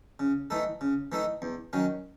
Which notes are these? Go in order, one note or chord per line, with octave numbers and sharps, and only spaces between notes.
C#3
E3 A3 D#4 A4
C#3
E3 A3 D#4 A4
E2
D#3 F#3 C#4